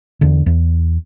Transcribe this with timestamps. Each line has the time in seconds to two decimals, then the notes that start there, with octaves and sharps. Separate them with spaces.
0.21 E2 D3
0.46 E2